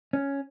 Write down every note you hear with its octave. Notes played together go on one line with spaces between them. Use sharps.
C#4